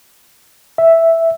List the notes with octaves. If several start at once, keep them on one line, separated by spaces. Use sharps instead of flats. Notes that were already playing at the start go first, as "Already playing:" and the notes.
E5